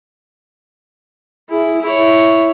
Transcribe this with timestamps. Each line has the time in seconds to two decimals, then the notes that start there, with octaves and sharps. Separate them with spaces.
1.49 E4 G#4
1.81 E4 C#5